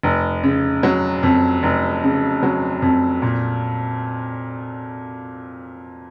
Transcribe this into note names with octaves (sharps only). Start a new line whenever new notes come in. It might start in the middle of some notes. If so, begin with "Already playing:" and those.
F1
C#3
F#3
F2
F1
C#3
F#3
F2
A#2